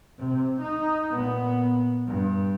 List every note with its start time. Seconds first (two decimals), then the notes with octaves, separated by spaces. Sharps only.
0.19 C3
0.61 D#4
1.11 A#2 B3
2.07 G2